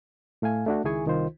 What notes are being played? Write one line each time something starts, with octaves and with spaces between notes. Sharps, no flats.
A2 A3 F5 G#5
A3 D4 F#4
C#2 D#3 E4 G#4 G#5 C#6
C2 D#3 D#4 F4 C5